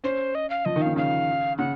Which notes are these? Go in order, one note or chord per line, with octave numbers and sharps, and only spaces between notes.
C#4 C5
D#5
F5
F3 D#5
D#3
C#3 F5
C#3 F5
C#3 F#5